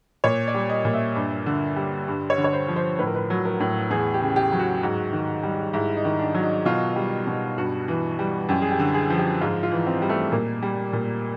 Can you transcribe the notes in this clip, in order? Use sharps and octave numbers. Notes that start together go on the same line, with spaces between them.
A#2 C#5
D5
G3
D#5
A#2
E5
G2
D3
G3
G2
C#5
D3
C#5
C5
F3
C5
A2 B4
A#4
B4
F#3
A#4
A2
E2 G#4
G4
C#3
G4
F#3
F#4
G#2
D#3
G3
G#2 E4
D#4
D#3
D4
F#3
D#4
B2 F4
G3
B2
G2 F#4
E3
G3
F#2 G4
G#4
G4
D3
G#4
F3
G4
G#2 F4
F4
E3
C4
G3
A3
A#2 A#3
G3
A#2